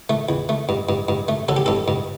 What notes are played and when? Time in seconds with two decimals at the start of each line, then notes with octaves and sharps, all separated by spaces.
0.10 A3
0.29 E2
0.49 A3
0.69 G2
0.89 G2
1.09 G2
1.28 A3
1.49 F#3 A4
1.57 G4
1.66 G2 A4
1.88 G2